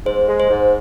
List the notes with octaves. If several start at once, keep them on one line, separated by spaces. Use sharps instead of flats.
G#2 C5
G#3
C5
G#2